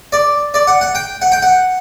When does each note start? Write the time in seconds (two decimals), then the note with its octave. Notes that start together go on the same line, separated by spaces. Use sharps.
0.12 D5
0.54 D5
0.67 F#5
0.81 F#5
0.95 G5
1.22 F#5
1.32 G5
1.42 F#5